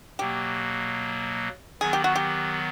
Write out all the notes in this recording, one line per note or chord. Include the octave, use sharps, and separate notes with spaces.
B2 F#3 A#3 G4
D#3 F#3 B3 G#4
G4
F#4
G4